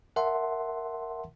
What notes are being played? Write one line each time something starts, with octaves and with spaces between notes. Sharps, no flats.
A#4 E5 F#5 A5 C6